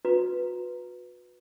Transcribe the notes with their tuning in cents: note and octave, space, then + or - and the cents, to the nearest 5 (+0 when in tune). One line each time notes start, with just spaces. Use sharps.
F#4 -35 B4 +0 A#5 +0